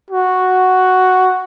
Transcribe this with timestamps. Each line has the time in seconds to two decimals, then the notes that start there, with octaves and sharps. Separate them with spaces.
0.10 F#4